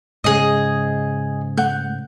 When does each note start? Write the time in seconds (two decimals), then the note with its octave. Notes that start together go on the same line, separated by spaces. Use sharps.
0.24 G#2 C#3 G#3 G#4 D#5
1.57 A3 F#5 G6